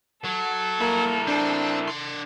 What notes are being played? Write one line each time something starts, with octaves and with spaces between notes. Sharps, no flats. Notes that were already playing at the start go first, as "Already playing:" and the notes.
F#3 A4
A#3 E4 A#4
C4 D4
D4 C6